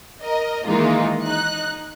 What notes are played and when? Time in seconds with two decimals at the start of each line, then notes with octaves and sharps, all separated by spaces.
0.23 A#4 D#5
0.66 D#3 E3 G#3 A#3 D#4 F4
1.24 D#4 F#6